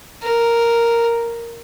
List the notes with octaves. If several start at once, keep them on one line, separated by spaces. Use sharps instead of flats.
A#4